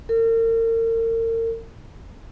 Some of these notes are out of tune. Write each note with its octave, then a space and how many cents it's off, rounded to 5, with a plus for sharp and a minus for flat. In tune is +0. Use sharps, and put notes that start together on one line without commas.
A#4 -40